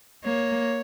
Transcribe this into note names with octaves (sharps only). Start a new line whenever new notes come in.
A#3 C#5